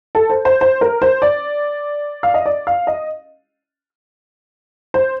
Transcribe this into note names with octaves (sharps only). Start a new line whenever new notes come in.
A4
C5
C5
C5
A#4
C5
D5
F5
D#5
D5
F5
D#5
C5